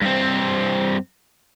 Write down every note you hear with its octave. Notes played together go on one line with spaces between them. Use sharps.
G2 C4